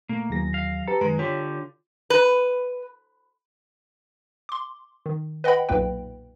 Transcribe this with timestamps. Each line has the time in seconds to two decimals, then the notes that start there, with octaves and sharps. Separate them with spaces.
0.09 A#2 A3 A#3
0.30 D#2 E3 F#3 G#4 A#6
0.54 F5
0.88 G4 A4 B4 A#5
1.01 F#2 D#3 G#3 B4 A#5
1.19 D3 F4 G4 C#5
2.10 B4
4.49 C6 D6
5.06 D#3
5.44 B4 D#5 F#5 G5 B5
5.69 B1 F2 A#2 A#3 B4 G5